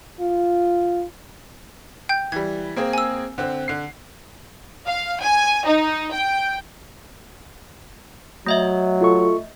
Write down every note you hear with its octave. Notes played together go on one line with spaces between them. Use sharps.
F4
G5 G6
E3 G3 G#6
A#3 C4 G#4
G#5 E6
D3 C4
D3 C7
F5
G#5
D#4
G5
F#3 A3 D#5 E5
F4 A4 C#6